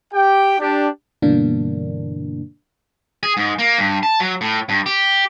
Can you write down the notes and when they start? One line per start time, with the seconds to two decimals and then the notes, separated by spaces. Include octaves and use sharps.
0.13 G4 G5
0.59 D4 G4
1.22 G2 B2 D3 E3 A#3 D4
3.23 G#4
3.37 G#2
3.59 A#3
3.78 G2
4.03 A5
4.20 F#3
4.41 A2
4.69 G2
4.86 G4